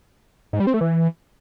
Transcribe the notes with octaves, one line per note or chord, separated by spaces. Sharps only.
G#2
G3
C4
A3
E3